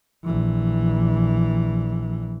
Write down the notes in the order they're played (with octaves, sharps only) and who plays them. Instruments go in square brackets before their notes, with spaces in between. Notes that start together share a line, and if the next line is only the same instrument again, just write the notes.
[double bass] A#1 E3